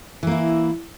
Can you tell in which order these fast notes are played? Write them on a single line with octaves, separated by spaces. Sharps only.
E3 A#3 E4